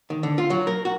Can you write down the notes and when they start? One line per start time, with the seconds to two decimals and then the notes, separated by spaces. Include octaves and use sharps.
0.10 D#3
0.23 D3
0.38 F4
0.50 F#3
0.67 A#4
0.85 F#4